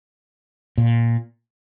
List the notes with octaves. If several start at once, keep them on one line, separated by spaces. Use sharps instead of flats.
A#2